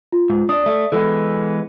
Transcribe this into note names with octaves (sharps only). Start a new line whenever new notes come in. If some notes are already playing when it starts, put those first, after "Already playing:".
F4
G#2
D4 D5 D#6
A3
E3 G#3 B3 A4